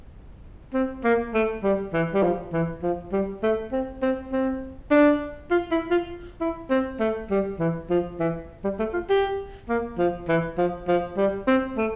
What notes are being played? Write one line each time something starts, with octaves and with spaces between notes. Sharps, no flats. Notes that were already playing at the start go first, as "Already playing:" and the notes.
C4
A#3
A3
G3
E3
G3
F3
E3
F3
G3
A3
C4
C4
C4
D4
F4
E4
F4
E4
C4
A3
G3
E3
F3
E3
G3
A3
F4
G4
A#3
F3
E3
F3
F3
G3
C4
A3